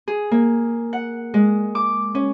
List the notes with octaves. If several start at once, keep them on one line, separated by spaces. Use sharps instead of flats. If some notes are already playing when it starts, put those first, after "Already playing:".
G#4
A#3
F#5
G#3
D6
C#4